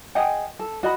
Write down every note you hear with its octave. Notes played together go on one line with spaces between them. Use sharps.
G#4 D#5 F#5 G5
A4
F#4 D#5 B5